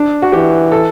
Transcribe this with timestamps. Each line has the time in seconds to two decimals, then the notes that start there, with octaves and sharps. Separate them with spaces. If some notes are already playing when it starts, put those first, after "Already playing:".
Already playing: D4
0.22 F#4
0.32 E3 G4
0.72 A4